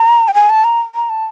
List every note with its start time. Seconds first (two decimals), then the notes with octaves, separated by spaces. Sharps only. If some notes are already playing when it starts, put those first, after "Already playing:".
Already playing: A#5
0.28 G5
0.34 G#5
0.50 A5
0.64 A#5
0.95 A#5
1.10 A5